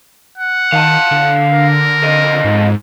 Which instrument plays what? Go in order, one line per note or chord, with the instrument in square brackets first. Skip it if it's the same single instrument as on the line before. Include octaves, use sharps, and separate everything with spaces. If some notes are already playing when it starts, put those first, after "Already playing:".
[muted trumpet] F#5
[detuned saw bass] D#3 [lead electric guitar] F5 A5
[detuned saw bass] D3
[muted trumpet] A#4
[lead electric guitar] F2 D#5
[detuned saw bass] G#2